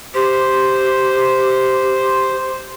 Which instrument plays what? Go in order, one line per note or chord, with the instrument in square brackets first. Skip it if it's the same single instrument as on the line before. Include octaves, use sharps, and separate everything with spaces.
[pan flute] G4 [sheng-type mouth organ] C5